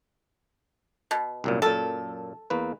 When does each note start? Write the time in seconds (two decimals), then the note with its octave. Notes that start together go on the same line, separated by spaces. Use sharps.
1.11 B2
1.44 C2 F#2 A#2
1.62 F#2 A#2 A4
2.50 E2 A#3 B4